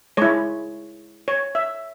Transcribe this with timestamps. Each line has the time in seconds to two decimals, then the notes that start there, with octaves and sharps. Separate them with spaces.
0.17 G#3 E4 C#5
1.28 C#5
1.55 E5